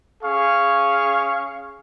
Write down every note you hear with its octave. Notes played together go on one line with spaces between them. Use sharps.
C#4 G#4 F5 C#6